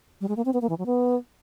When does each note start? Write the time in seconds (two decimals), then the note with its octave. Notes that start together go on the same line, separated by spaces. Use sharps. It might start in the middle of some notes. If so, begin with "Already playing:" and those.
0.21 G3
0.28 G#3
0.37 A#3
0.45 C4
0.53 B3
0.62 A#3
0.69 E3
0.78 F#3
0.86 B3